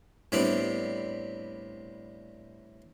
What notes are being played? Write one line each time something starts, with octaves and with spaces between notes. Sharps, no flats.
A2 G3 B3 C4 D4